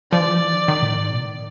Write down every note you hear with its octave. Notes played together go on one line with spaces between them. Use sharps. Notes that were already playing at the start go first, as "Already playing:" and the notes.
F3 D5
E3
F3
E3
D#3
D#3
A2
G#2
B2
D#3